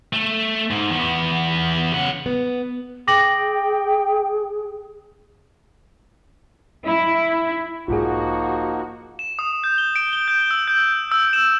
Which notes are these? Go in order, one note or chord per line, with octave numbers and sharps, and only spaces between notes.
A3 A4
G#2
E2 B3
C#3 F#5
B3
G#4 G5 D6 A#6 F#7
E4
B1 G#2 F3 A#3 D#4 F4 F#4 G#4
E7
D#6
G6
G7
D7
G7
G6
E6
G6
E6
E7